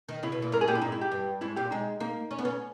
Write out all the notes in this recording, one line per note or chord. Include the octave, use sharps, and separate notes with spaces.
D#3
C#3 E4
B2
A#2
G#2 A#4
G#4
A#2 G4
E4
G#2 D#4
E4
G4
G2
G#2 E4
A#2 G4
G#3 D#4
A#3 D#4
C#4
B3
C#4